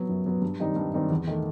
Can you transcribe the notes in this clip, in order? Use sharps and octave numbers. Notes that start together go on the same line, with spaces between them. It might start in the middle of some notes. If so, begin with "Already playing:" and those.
Already playing: F#3 B3
F#2
F#3 B3
G2
D#3 G3 C4 D#4
G2
D#3 G3 C4 D#4
E2
D#3 A3